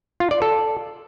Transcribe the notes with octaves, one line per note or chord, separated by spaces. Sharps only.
F4
D5
A4